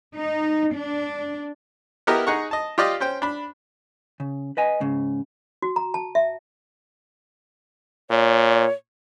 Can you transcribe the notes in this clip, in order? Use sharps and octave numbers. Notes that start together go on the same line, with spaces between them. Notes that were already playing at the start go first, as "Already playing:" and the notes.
D#4
D4
B3 E4 G4 A#4 D#5
D#4 G#4 F#5 A#5 C#6
D#5 A5
F4 G4 D5 D#5 F5
C#4 C5 G5
D4 B5
C#3
B4 D#5 G#5
G#2 C#3
F#4
A#5
A5
E5
A#2 C#5